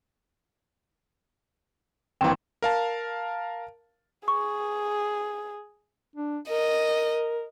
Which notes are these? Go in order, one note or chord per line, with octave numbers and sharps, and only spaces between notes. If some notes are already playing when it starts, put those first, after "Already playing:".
G#1 G2 E3 A#3 C4 G5
A#4 F5 A5
G#4 C#6
D4
A#4 D#5